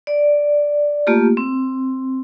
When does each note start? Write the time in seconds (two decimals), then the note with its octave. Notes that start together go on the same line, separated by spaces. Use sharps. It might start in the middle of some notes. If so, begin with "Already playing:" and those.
0.07 D5
1.07 A3 A#3 F4 G4
1.37 C4